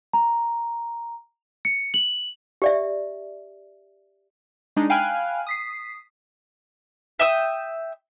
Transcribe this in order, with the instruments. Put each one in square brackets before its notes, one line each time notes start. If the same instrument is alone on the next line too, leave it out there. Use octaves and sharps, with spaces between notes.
[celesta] A#5
C#7
F#7
[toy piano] G4 D5 E5
[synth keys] G#3 D4 D#4
F5 G5 G#5 B5 F6 F#6
D#6 B6 C7
[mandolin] E5 G5 D#6 E6